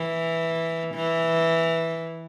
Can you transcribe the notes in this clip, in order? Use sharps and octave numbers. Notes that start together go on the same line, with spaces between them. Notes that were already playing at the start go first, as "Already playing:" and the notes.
Already playing: E3
E3